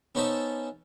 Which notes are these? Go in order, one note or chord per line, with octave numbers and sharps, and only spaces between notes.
B3 C#4 D#4 C5 E5 A5